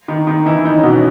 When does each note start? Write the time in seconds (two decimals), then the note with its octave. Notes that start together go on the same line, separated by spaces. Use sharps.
0.08 D#3 D#4
0.27 D#3 D#4
0.46 E3 E4
0.65 D#3 D#4
0.77 C#4
0.83 B2 B3